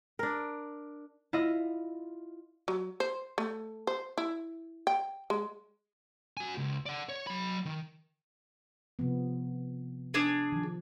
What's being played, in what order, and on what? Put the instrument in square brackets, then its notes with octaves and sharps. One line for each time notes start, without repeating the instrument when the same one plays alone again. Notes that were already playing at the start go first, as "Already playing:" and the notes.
[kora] D4 A#4
[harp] E4 F4 D#5
[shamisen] F#3
C5
A3
C5
E4
G5
G#3
[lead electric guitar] F#4 G#5
C#2
D5 F#5
C#5
F#3 B5
D#3
[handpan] C3 F3 B3
[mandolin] D4 G#4
[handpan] D#3 F3